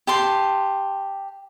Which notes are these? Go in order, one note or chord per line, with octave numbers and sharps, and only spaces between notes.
G4 A5 C6